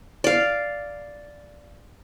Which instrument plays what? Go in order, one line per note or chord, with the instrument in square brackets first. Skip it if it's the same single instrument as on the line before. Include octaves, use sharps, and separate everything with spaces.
[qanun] D5 F5